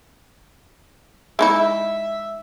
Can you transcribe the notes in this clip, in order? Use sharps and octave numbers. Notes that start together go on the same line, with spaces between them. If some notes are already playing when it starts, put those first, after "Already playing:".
G#3 D#4 E4 E5